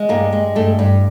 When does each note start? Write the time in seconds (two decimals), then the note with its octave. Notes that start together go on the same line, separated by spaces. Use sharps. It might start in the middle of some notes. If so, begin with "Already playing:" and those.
Already playing: G#3
0.09 G2 A#3
0.32 G#3
0.55 G2 A3
0.79 G2